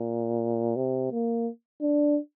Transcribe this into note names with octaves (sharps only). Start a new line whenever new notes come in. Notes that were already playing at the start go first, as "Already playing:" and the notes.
Already playing: A#2
C3
A#3
D4